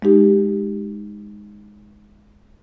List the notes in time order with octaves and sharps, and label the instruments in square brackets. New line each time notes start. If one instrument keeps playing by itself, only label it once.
[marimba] G#3 D#4 G4